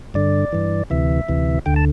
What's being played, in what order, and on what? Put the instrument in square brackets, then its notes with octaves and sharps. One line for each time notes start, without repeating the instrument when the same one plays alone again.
[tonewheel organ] G2 D3 D5
G2 E3
D2 C3 E3 E5
D2 C3 E3
D2 D3 G5
A5